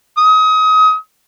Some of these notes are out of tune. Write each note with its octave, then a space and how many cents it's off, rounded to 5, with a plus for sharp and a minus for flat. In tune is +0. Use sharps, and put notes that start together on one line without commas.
D#6 +30